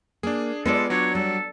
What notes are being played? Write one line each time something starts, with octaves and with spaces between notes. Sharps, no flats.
A#3 D4 G#4
G#3 B3 F4 A4 D5
F#3 D4 C#5
G3 A4